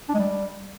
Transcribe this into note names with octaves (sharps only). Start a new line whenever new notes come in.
D4
G#3
G3